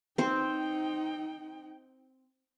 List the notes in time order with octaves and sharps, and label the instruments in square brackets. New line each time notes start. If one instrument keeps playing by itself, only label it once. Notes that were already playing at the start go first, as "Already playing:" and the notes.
[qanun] C4 C5 [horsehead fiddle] D#4 G5